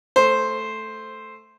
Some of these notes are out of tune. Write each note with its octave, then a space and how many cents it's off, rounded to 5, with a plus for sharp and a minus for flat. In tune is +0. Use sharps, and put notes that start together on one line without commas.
A3 +0 C5 +0